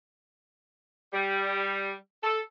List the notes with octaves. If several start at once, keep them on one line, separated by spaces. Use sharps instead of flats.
G3
A4